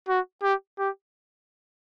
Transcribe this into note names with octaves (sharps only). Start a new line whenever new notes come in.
F#4
G4
G4